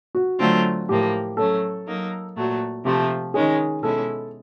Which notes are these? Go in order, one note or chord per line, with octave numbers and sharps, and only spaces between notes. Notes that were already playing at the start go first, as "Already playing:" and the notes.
F#4
D3 F#3 A3 C4 F4
A2 F3 A#3 G4
F#3 A3 C#4 A4
F#3 A#3 D#4
A#2 F#3 A3
C3 F3 A3 G4
D#3 G#3 C#4 G#4
B2 G#3 C#4 E4 A4